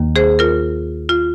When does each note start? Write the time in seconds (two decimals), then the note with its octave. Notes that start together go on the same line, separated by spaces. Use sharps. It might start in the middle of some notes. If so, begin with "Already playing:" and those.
Already playing: D#2 D#3 A#3
0.16 G#4 C5
0.39 F4 A#4
1.09 F4